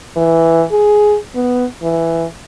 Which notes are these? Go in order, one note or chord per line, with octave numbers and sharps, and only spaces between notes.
E3
G#4
B3
E3